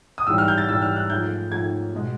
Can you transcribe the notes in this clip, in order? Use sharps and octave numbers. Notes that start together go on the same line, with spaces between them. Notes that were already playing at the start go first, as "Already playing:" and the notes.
D#6
G#2 E3 G3 E6
F6
G6
A6
G#2 E3 G3 E6
F6
F#6
G#2 F3 A3 G6
G#2 F3 A3 G#6
B2 G#3